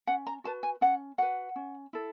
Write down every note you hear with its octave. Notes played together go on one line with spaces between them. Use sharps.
C#4 F#5
A#5
F#4 B4 A5
G#5
C#4 F#5
F#4 B4 F#5
C#4
E4 A4